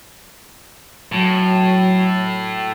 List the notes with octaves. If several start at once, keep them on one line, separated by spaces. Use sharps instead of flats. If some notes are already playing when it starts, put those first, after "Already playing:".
A2 F#3